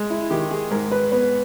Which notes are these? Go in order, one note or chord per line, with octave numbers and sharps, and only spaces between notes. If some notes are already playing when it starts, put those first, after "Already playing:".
Already playing: G#3
E4
D#3 G4
G#4
G#2 A#4
B4
B3